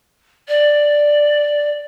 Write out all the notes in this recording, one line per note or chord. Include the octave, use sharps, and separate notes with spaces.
D5